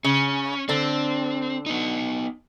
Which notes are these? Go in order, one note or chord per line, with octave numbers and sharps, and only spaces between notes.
C#3 C#4
D3 C4 D4
B3 D#4